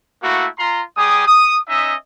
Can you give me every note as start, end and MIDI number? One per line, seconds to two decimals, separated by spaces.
0.23 0.47 57
0.23 0.47 58
0.23 0.47 64
0.23 0.47 66
0.58 0.83 65
0.58 0.83 82
0.58 0.83 84
0.97 1.24 55
0.97 1.24 67
0.97 1.24 68
0.97 1.24 80
0.97 1.24 87
1.27 1.58 87
1.69 1.94 61
1.69 1.94 63
1.69 1.94 75
1.69 1.94 76